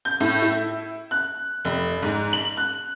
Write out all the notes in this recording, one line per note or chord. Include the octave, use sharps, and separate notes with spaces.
G6
A2
E4
F#6
F1
G#2
F#7
F#6